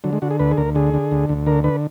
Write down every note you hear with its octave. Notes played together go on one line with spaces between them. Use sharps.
D3 F#3
G#3
D3 F#4
G#4
D2 B4
G#4
D2 A#4
D3 G#4
D3
D2
D2
D3 A#4
D3 B4